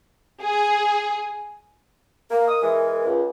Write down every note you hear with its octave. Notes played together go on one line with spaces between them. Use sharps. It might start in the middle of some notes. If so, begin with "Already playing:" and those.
G#4
A#3 A#4
D#6
E3 G#3
C#2